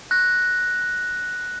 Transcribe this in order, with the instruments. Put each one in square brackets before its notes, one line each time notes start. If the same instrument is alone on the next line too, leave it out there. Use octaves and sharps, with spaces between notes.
[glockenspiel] F#6 A#6